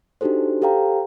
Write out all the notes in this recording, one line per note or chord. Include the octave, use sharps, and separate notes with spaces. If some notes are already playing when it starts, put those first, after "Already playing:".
D4 D#4 F#4 G4 A4 C5
G4 A4 C5 F5 G5 A#5